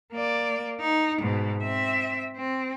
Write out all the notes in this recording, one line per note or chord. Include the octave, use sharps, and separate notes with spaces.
A#3 D5
D#4
G#2 B2
C4 E5
C4